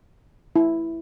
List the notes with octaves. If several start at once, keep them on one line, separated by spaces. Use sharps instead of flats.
E4